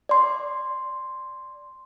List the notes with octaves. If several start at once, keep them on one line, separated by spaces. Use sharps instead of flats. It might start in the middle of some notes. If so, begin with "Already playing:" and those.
D5 C6